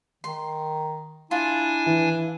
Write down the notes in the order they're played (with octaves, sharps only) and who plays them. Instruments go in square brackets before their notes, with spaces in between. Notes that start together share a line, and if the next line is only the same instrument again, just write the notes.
[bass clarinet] D#3 [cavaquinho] C6
[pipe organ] D4 G#5 [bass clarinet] E4 [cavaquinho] F4
[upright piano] E3